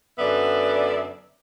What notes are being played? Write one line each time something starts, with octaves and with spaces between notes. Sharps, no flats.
F#2 D3 B3 D5 E5